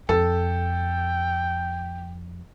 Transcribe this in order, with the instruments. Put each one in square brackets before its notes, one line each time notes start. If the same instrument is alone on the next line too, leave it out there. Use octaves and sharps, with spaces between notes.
[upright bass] F2 [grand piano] A4 [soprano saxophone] G5